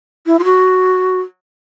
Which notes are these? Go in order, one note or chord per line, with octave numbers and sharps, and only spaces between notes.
E4
F4
F#4